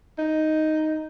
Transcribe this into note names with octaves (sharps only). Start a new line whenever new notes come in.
D#4